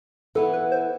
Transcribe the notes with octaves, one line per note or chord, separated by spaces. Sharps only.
E3 B3 E4 A4
B4
C5